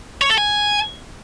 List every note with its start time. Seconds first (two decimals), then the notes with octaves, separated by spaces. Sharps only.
0.21 C#5
0.30 A4
0.38 G#5